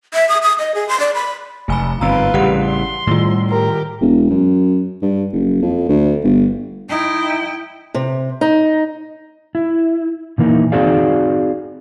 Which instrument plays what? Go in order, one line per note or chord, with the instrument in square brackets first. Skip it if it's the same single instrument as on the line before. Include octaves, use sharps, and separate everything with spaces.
[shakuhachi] E5
D#6
D#6
D#5
G#4
C6
D5
B5
[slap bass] F1 [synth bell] A3 G#5 B5
[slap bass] G1 G#2 C4 [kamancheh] F4 B4 [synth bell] A#5 E6
[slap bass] A1 C#3 G3 [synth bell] G4 F#5
[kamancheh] C6
[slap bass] A2 [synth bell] D#3 G3 F4
[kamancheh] G4 A#4
[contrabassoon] E1
F#2
G2
F#1
F2
D2
G1
[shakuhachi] D#4 [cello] E4 G5
[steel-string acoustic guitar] C3
D#4
[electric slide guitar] E4
A#2 E3 A#3 D#4
C4 D#4 F#4 G#4 D5 F5